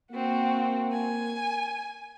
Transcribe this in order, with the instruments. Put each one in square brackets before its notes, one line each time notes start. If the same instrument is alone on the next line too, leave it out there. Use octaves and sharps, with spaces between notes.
[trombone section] A#3 [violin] C4 F#4
[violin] G#5